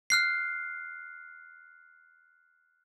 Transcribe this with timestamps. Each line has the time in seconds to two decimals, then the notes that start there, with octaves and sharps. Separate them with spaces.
0.10 F6 F#6 C7